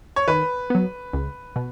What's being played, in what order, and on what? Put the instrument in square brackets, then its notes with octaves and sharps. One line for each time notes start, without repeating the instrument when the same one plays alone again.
[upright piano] C#5
[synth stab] D#3 [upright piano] B4
[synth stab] F#3 B3
C#2
B2